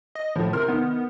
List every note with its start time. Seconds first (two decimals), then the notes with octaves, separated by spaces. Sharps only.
0.15 D#5
0.36 A2 F3 A3
0.53 C3 A#4 C6 F6
0.68 D#3 B3